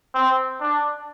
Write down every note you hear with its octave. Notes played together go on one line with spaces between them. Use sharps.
C4
D4